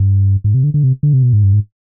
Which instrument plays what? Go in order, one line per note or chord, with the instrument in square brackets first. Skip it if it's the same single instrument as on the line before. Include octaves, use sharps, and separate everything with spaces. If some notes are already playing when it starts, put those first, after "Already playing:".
Already playing: [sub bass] G2
G#2
C3
D3
D3
C3
D3
C3
B2
G#2
G2
G#2